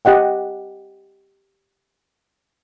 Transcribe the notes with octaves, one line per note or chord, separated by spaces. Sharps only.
G4 D#5 F#5 G5